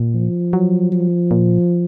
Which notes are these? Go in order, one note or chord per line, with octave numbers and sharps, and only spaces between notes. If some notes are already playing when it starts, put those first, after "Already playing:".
Already playing: A#2
F3
F#3
F3
A#2